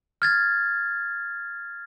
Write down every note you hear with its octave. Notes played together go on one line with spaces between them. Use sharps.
F6 G#6 A6